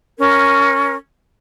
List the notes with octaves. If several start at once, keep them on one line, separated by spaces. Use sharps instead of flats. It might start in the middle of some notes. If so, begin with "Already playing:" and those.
C#4 A#4